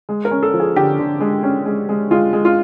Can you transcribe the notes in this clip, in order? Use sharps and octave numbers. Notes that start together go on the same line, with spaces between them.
G#3
A#4
C#4
A4
F3
G#4
D3 G4
D3
G#3
C#4
G#3
G#3
G#3 F4
G#3
F4